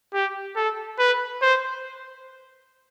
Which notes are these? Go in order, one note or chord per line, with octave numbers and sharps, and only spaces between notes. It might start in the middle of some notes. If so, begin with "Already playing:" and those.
G4
A4
B4
C5